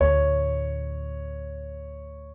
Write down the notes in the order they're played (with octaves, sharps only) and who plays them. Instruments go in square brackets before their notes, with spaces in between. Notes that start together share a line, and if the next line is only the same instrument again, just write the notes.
[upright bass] D2 A2 [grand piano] C#5